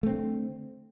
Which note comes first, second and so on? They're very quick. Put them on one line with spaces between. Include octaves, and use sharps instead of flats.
A3 C4 D3